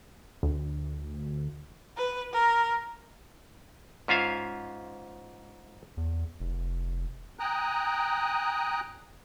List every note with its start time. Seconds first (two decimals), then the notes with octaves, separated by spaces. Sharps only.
0.43 D2
1.97 B4
2.33 A#4
4.08 G#2 C#4 F4 E5 F5
5.97 E2
6.40 F1
7.39 G5 G#5 A#5 D#6 F#6